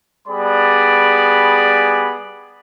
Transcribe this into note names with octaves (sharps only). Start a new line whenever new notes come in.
G3 B3 G#4 D5 B5